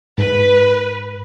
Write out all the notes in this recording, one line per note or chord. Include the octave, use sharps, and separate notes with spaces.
G#2 B4